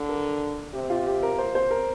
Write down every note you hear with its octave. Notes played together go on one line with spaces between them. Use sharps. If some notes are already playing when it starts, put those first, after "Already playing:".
Already playing: D3
A#4
C3 G4
F4
G4
A#4
A#2 C5
C5
A#4